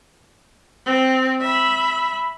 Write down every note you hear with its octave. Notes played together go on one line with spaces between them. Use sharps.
C4
E5 B5